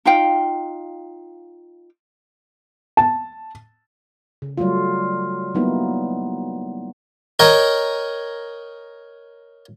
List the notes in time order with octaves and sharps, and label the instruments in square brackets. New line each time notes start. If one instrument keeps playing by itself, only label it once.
[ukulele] D#4 F4 F5 G5
[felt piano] A5
[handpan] C#3
F#3 G3 A3 F4
F#3 G3 A#3 B3 D#4 E4
[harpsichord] A#4 C#5 D#5 G5